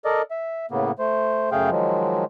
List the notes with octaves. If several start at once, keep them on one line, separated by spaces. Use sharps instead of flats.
A4 A#4 D5 D#5
E5
A2 C#3 A#3 B3
A3 C5
F#2 C#3 A3 G#4 F5 G5
D#3 F3 F#3 G#3